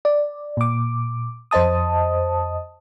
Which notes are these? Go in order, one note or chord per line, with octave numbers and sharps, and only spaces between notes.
D5
A#2 D6
F2 C5 D#5 A5 D#6